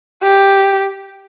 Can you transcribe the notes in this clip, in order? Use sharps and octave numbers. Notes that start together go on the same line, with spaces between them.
G4